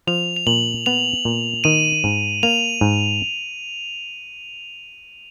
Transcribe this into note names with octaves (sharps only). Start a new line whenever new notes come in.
F3 F7
F7
A#2 F#7
B3 F7
A#2
D#3 D#7
G#2
A#3 F7
G#2